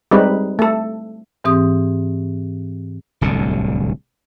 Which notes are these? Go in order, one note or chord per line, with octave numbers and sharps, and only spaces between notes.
G3 G#3 C4 D#4 B4
A3 A4
G#2 E3 C4 G4 D#6
D1 C2 D3